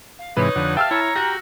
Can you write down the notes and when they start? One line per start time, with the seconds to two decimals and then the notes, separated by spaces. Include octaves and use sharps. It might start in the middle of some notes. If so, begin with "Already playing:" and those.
0.18 F5
0.37 G#2 C3 E3 D#4 B4 C#5
0.56 F2 D3 F#5
0.77 G4 E5 F5 G5 A5 E6 F6
0.91 E4 C#5 A#5
1.16 F#4 G4 A#6